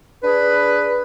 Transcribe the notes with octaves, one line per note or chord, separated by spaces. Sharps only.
D4 G#4 B4